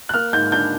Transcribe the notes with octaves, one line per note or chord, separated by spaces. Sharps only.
F#6
A#3 F6
G#2 G6
D4 G6